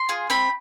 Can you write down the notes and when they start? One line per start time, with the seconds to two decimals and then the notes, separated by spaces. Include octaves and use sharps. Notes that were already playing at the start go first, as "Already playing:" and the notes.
Already playing: C6
0.09 F4 G#4
0.30 C4 B5